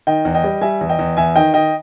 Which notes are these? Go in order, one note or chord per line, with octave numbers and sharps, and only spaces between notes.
D#3 D#5 G5
E2
D#5 G5
G3
G3 E5 G#5
E2
D#5 G5
E2
E2 E5 G#5
D#3 D#5 G5
D#3 D#5 G5